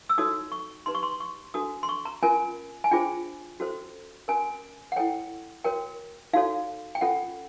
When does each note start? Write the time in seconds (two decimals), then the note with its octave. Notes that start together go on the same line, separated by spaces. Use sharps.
0.09 E6
0.18 D#4 F#4 A4 C#5 D#6
0.52 C#6
0.86 D#4 G4 B4 C6
0.95 C#6
1.03 C6
1.20 C#6
1.54 D4 F#4 A4 D#6
1.83 C6
1.89 C#6
2.05 A#5
2.23 C#4 F4 A#4 G#5
2.84 G#5
2.91 D4 F4 G#4 C5 G5
3.60 C#4 F#4 A4 C5
4.28 C#4 F#4 A#4 G#5
4.92 F#5
4.96 E4 A4 C#5 G5
5.64 F#4 A#4 C#5 G5
6.33 D#4 F#4 A4 C#5 F5
6.95 G5
7.01 C#4 F4 A4 F#5